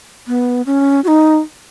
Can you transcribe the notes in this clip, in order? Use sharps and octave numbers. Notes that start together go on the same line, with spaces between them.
B3
C#4
F#4
D#4